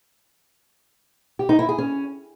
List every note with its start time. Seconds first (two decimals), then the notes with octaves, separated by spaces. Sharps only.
1.39 G4
1.49 D#4
1.59 E4
1.69 G#4
1.78 C#4